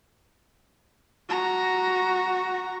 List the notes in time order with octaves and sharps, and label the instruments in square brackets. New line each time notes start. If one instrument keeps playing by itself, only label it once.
[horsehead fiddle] F#4 A#5